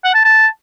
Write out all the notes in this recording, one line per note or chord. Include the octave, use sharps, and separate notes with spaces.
F#5
A5
A5